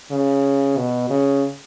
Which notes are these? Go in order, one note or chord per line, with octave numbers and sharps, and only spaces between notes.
C#3
B2
C#3